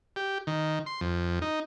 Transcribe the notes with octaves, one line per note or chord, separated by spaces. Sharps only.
G4
D#3
C6
F2
D#4